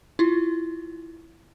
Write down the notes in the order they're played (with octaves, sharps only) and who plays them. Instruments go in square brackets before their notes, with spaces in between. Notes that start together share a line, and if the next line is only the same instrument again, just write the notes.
[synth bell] E4 F4